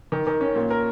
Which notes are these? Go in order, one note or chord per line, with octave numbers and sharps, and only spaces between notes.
D#3
D#3
C#4
A#2
A#4